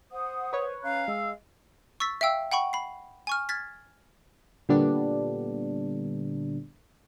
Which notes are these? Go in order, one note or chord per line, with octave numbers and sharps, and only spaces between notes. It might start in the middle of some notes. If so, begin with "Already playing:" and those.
C5 F#5 D#6
B4 C#5
C#4 F5 A#5 F#6
G#3 E6
C#6 E6 A6 B6
E5 F5 G5 E6
F#5 G5 B5 C#6
B5 C7
G#5 C#6 F6
F6 G#6 A6 B6
A#2 D3 G3 B3 D4